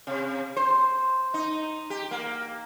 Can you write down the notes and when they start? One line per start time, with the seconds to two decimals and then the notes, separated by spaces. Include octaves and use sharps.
0.07 C3
0.56 C5
1.34 D#4
1.90 G4
2.11 A#3